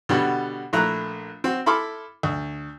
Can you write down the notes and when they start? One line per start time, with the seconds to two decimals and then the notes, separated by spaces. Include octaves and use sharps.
0.09 B2 D3 G3 F#4
0.73 A#1 A3 E4 A#5 F#6
1.44 C4 F#4
1.66 E4 A4 B5 C6 D6 F6
2.23 D2